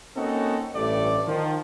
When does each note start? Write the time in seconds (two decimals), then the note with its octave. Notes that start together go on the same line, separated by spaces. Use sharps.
0.15 A#3 C4 C#4 D#4 F#4 A4
0.73 A1 G2 A3 D5
1.26 D#3 F3